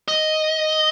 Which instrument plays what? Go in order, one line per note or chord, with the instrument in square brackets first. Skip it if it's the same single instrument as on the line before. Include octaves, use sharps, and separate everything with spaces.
[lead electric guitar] D#5